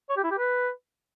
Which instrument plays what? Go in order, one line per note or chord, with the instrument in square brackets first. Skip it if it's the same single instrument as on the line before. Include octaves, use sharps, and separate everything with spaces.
[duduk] C#5
G4
E4
G4
B4